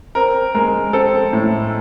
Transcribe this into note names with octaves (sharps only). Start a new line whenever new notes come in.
C4 A#4
G#3 A#4
C4 A4
A2